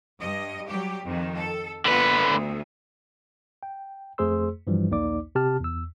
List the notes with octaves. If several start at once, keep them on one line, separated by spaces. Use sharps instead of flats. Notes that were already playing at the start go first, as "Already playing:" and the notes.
G2 D#5
F#3 G3 G4
F2 D#3
A4
D3 A#3 B3 F4 B4
D2
G5
F2 A3 G#4 C5 C6 E6
G2 E3 F3 G3
A#1 D#2 A#3 D#4 D5 D6
C3 G4 A5 F6
E2 E6